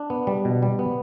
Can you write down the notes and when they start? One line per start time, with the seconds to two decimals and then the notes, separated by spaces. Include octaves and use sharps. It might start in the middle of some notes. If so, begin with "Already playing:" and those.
Already playing: D4
0.10 B3
0.27 G3
0.45 B2
0.62 G3
0.79 B3